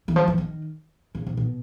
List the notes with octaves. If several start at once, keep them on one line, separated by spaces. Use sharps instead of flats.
E3
F3
E3
D#3
C#3
C3
B2